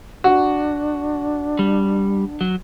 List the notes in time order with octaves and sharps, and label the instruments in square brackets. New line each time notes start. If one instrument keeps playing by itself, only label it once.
[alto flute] D4 [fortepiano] F#4
[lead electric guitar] G3
F#3